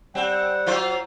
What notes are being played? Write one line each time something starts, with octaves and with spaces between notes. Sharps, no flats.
G3 C4 F#5
F#3 F4 C5